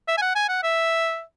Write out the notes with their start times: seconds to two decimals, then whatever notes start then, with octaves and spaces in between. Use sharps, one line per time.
0.08 E5
0.17 G#5
0.22 F#5
0.35 G#5
0.49 F#5
0.63 E5